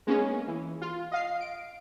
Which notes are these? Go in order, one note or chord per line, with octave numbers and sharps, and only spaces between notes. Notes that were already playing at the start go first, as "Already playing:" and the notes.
G#3 A#3 B3 C#4
E3
F4
D#5 F5 C7
D7